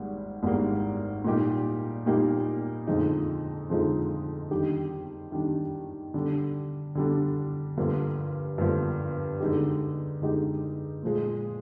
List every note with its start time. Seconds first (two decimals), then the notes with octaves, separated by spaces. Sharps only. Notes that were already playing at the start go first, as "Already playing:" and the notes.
Already playing: G#1 G#2 G3 A#3
0.43 G#1 G#2 G3 A#3
1.25 A#2 G3 A#3 D#4 G4
2.06 A#2 G3 A#3 D#4 G4
2.87 F2 D3 F3 G#3 D#4
3.70 F2 D3 F3 G#3 D#4
4.51 D#3 G3 D4 G4
5.32 D#3 G3 D4 G4
6.14 D3 G3 D4
6.95 D3 G3 D4
7.77 G2 D3 F3 A#3
8.58 G2 D3 F3 A#3
9.40 D3 G#3 D#4 G4
10.22 D3 G#3 D#4 G4
11.03 A#2 F3 G#3